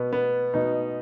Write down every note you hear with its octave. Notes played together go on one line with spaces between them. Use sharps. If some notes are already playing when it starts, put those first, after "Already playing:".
Already playing: B2 B3
B3
B2 D#4